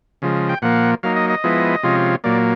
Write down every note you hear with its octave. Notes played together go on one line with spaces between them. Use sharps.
C#3 F3 G#3
G5
A#2 F3 A#3 F#5
F#3 A#3 D#4 F5
D#5
D#5
F3 G#3 B3 E4
C3 F3 G#3 C#4 F4
A#2 F#3 A#3 D5